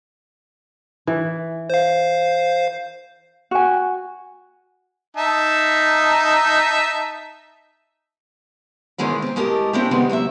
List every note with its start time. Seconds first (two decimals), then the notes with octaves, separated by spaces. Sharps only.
1.07 E3
1.70 C5 F5
3.51 F#4 G#5
5.17 D#4 E5 A5
8.98 G#2 D#3 E3 G#3 C#4 E4
9.22 C4 G#4
9.36 A2 G#3 G4 A#4 D#5 A5
9.73 C4 D4 E4 F4 G4
9.91 D#3 G3 G#3 B3 C4
10.09 D#2 F#3 D#5 E5